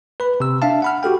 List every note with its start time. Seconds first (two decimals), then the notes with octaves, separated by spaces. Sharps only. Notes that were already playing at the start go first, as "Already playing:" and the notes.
0.20 B4 B5
0.40 C3 E6
0.62 D4 E5 F5 A5
0.82 F#5 B5 F6
1.03 F#4 G4 A4 G5